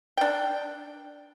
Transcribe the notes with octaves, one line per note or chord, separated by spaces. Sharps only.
D4 G5